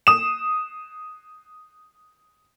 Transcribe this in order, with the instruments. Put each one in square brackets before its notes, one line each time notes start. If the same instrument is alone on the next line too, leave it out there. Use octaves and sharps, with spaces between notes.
[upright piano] D#6 E7